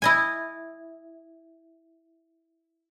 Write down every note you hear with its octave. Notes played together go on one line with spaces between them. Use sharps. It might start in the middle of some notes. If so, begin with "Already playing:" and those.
E4 D#5 G#5